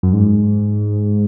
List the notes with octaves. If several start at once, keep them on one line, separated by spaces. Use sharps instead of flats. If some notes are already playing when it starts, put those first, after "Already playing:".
F#2
G#2